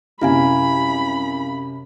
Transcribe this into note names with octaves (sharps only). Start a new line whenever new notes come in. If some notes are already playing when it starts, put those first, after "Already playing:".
F#2 C3 E4 F5 G#5 B5